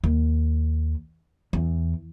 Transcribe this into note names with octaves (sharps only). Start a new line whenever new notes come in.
D#2
E2